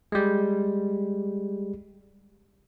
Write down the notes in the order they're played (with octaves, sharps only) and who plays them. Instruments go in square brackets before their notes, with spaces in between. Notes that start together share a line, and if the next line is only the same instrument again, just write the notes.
[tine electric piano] G3 G#3